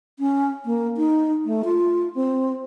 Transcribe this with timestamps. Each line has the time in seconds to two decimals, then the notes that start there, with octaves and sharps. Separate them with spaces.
0.19 C#4
0.65 A#3
0.97 D#4
1.45 A3
1.64 F4
2.15 C4